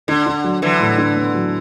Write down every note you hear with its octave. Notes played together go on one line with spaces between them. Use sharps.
D3 D4
D4
F#3
D3 E3 F#3
A2
D4
B3
F#3